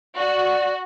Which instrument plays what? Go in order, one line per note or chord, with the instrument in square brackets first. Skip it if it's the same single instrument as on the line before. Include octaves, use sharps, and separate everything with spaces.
[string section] F#4 [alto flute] D5